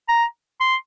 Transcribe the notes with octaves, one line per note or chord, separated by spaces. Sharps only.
A#5
C6